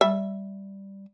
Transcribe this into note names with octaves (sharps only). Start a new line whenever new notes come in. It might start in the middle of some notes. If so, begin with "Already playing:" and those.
G3 E5